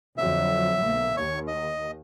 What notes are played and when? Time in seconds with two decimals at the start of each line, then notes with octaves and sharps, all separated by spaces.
0.18 F2 D3 F#3 E5
0.83 B1 A#3
1.17 D#2 C#5 C#6
1.48 D#5